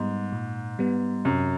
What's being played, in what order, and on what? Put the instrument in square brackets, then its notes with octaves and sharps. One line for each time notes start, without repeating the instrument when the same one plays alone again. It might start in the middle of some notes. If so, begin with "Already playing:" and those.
Already playing: [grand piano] G#2 [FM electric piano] G3 B3
[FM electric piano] A#2
G3 B3
[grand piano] F#2 [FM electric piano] C3